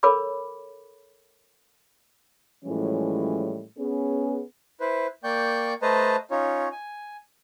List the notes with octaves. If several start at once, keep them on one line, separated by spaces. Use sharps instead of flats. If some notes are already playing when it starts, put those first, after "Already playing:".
A4 A#4 C#5 B5 D6
A2 E3 F3 G3 G#3 C#4
B3 C#4 G#4
E4 B4 C5
A#3 D5 G5 C#6 G6
A3 B4 C5 D#5 A5 A#5
C#4 D#4 F4 C#5
G#5